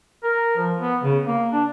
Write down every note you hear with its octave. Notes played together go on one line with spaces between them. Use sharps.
A#4
F3
B3
C#3
A#3
D4